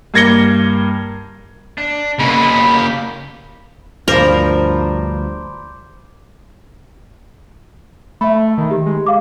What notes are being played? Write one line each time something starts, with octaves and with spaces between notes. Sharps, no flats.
G2 A#3 G#6 A#6 C#7 G7
D4
C#3 G#3 A#3 B3 B5
G4
D2 G2 F3 A#4 C5 D5 B5
A3 E5 B5
D#3
G4
G#3
F5 D6